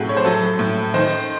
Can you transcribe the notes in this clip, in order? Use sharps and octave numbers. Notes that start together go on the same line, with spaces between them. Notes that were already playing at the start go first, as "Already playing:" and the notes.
Already playing: A2 C3 F#3 F#4 G#4
C#5
C5
F#3 A4
A2
D#3 C5